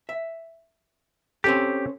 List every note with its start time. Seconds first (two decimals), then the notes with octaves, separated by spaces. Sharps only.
0.09 E5
1.44 C4 C#4 G4 A4